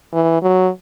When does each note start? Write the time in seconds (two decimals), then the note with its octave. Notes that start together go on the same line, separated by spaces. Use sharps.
0.13 E3
0.43 F#3